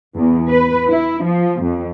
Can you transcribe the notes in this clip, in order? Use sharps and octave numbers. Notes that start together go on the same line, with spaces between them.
E2
B4
E4
F3
F2